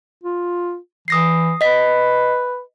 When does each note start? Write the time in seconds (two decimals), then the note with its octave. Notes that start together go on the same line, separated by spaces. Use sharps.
0.24 F4
1.08 E3 D#6 A#6 C7
1.61 B4 D#5 B6